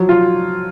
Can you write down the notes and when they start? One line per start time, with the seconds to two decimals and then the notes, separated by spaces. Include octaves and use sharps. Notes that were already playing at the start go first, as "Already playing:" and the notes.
Already playing: F3 F#3
0.09 F4